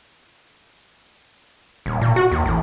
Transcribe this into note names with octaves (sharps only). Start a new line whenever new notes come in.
D#1
A#2
F#4
D#2
A1